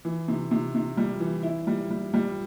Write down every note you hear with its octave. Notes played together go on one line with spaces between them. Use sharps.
E3
C3
C3
C3
G3
E3
E4
G3
G3
G3